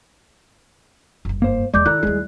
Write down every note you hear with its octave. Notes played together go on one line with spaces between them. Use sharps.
F#1 G2
A#3 C5
E2 G#3 B3 D5 D6 G6
D#3 E4 A4 D5 A#5 F#6
D#2 G3 G#3 E4 G#4